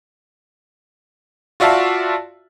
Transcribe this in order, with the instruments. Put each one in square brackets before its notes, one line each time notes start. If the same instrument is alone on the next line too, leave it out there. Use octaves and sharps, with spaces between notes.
[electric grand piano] F4 F#4 D5 E5 F5 A5